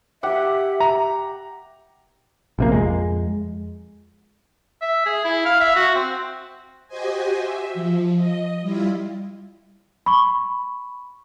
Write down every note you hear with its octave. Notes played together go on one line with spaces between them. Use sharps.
G4 E5 F#5
A#5
A#1 C3 A#3
F2 G#3
E5
G#4
E4
F5
E5
F#4
C4
F#4 G4 C5 D#5 G#5
E5
F3
D#5
G3 E4 F4
B5 C#6